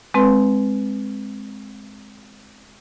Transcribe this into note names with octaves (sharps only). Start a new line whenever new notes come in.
G#3 C4 B4 C6